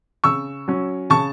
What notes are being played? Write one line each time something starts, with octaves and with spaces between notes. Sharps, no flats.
C#3 C#6 E6
F#3 C#4
C#3 A5 C#6